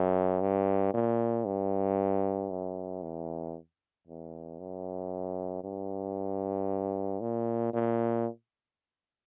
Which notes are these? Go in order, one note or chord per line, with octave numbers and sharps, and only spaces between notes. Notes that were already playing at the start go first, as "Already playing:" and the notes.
Already playing: F#2
G2
A#2
G2
F#2
E2
E2
F#2
G2
A#2
A#2